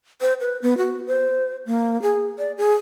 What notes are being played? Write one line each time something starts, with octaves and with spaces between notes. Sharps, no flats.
C5
B4
B3
F#4
C5
A#3
G#4
D5
G#4